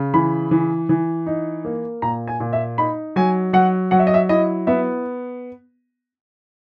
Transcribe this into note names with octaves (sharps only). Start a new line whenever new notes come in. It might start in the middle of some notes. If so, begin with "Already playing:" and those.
Already playing: C#3
E3 B5
E3
E3
D#4
A#3
A#2 A#5
G#5
A#2
E5
D#4 B5
F#3 G#5
F#3 F#5
F#3 F#5
E5
D#5
E5
E4 D#5
B3 E5